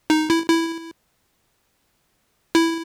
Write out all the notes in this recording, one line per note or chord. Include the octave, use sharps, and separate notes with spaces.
D#4
E4
E4
E4